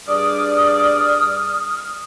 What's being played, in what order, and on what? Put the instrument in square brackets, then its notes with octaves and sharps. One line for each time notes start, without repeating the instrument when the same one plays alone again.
[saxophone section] G2 G#4 D5 [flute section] D#6 F6